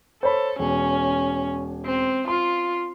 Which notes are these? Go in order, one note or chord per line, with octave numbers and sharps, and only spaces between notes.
A4 C5 C#5 B5
E1 C#4
C4
F4 C6